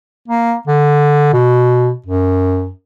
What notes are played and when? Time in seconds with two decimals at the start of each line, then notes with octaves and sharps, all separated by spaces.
0.28 A#3
0.67 D3
1.33 B2
2.06 F#2